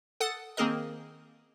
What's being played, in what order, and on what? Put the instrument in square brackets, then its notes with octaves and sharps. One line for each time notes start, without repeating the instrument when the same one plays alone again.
[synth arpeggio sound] A4 F#5 D#6 A6
D#3 A#3 C4 G#4 A#4 D#5